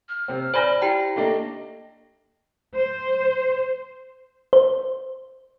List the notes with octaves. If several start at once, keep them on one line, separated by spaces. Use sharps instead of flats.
F6
C3 C4
C5 D5 G#5 B5 A#6
E4 G4 G5 A#5
A3 A#3 D4 D#5
C5
C5